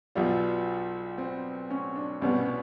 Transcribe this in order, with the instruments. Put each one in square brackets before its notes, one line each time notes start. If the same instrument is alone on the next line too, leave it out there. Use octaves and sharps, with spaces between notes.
[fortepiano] B1 B2 G3 [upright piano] F4
[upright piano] C4
C#4
D4
[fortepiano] C2 B2 G3 B3 [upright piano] C#4
[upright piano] C#4